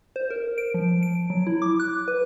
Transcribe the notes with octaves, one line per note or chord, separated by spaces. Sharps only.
C5
A#4
D7
F3
D7
F#3
E4
D6
F#6
B4